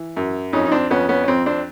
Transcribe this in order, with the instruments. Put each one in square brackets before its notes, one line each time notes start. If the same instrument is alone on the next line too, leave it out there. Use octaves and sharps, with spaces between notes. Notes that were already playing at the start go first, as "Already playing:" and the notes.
Already playing: [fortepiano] E3
F#2
F2 C#4 D#4
D#4
C4 D4
F2 B3 C#4
B3 C#4
C#4
F2 C4
C4 D4